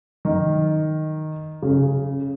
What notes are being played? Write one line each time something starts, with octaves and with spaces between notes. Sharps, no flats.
D#3
C#3